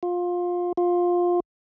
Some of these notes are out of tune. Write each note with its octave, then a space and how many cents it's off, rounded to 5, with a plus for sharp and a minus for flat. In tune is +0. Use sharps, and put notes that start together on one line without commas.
F4 +20
F4 +15